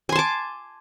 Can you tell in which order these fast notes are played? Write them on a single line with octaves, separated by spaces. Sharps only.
G#5 C6 A5 D6